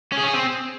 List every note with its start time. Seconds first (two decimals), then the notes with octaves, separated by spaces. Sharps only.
0.12 C#4
0.17 G#4
0.23 C#4
0.28 G#4
0.34 C4